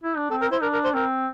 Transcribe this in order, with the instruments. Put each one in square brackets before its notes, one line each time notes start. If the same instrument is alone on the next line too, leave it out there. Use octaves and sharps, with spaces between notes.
[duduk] E4
D4
[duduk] C4 [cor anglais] A4
[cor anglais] A#4
[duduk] E4 [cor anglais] C5
[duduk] D4 [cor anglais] A#4
[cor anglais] A#4
C5
[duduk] C4 [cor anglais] A#4